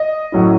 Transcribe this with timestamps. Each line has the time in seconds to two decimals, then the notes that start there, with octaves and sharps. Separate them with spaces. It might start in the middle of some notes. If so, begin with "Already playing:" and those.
Already playing: D#5
0.32 A2 F#3 C#4 E4